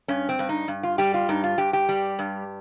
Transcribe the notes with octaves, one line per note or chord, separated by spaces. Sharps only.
G2 C#4
C4
G2
D#4
G2
F4
G3 G4
F4
G2 D#4
F4
G2 G4
G4
G3
G2